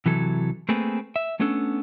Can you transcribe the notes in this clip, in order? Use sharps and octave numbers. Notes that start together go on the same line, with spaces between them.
C3 E3 F#3 A4
A3 A#3 C4 G#4 A4 B4
E5
A3 B3 C#4 D4 A4